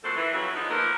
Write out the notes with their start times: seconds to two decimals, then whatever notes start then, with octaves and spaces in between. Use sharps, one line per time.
0.04 F#2 A#2 C4 F#4 A4 C5
0.16 E3
0.33 F2 C#3 E3 F#3
0.54 D3 F3 G#3 D#4
0.70 F3 A#3 B3 A4 A#4